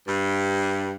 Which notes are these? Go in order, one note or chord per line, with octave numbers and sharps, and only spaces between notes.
G2